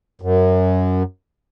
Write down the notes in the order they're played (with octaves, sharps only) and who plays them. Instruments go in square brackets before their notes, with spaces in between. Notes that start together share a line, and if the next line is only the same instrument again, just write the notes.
[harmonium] F#2